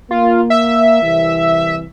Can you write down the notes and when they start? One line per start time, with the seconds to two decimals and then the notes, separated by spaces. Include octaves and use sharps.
0.11 A#3 F4
0.50 E5
1.02 C2 E3